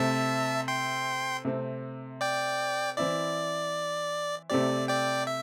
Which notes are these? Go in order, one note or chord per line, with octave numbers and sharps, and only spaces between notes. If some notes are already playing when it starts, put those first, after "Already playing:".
Already playing: C3 A3 C4 E5 A5
G5 C6
C3 A3 C4
D5 G5
E3 C4 E4 D5
C3 A3 C4 G4 D5
D5 G5
E5